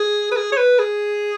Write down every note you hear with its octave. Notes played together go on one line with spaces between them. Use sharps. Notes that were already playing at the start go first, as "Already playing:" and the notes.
Already playing: G#4
B4
G#4
C#5
B4
G#4